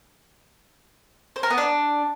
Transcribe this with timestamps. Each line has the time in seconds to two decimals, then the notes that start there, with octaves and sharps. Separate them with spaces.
1.36 C5
1.43 A#4
1.50 B3
1.58 D4